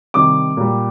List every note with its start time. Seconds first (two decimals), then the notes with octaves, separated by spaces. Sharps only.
0.14 C3 D#3 G3 D6
0.57 A#2 G3